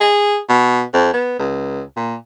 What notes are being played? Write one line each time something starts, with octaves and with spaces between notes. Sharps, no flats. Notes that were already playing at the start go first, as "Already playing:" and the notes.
G#4
B2
F2
B3
C#2
A#2